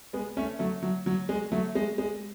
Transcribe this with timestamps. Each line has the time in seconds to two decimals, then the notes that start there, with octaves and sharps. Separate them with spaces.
0.13 G#3 B3
0.37 A3 C#4
0.59 F#3 A3
0.83 F#3
1.06 F#3
1.29 G#3
1.52 F#3 A3
1.75 G#3
1.98 G#3